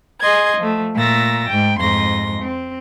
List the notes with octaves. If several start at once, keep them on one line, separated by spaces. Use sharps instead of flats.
G#4 D#5 C6 G#6
F3 A3
A#2 A3 A#5 E6 A6 A#6
G#2 G5
F2 G#2 C6 A#6
C4